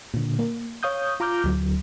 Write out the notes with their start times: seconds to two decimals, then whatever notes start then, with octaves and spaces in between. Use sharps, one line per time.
0.14 A#2 D3
0.39 A#3
0.83 C#5 F5 D#6 G6
1.20 F4 A#5 D6 F6 G6
1.44 D2 F#3